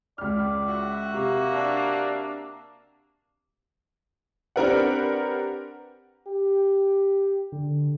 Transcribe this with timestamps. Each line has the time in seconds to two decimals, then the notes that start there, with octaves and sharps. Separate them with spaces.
0.18 C#2 D5 F6
0.67 F#4 E5
1.14 C3 A#3
1.53 D4
4.56 C4 D4 G4 A#4 B4 F#5
6.27 G4
7.52 D3